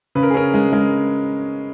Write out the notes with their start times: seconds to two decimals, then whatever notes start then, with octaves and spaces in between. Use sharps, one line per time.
0.15 C#3 B4
0.23 A#4
0.30 G#4
0.34 C#4 A#4
0.54 G#3
0.73 G#3 A#4